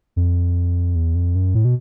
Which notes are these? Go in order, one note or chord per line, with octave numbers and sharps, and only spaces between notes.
F2
E2
F2
F#2
A2
B2